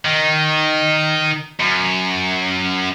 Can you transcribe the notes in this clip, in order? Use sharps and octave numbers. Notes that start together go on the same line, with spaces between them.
D#3
F#2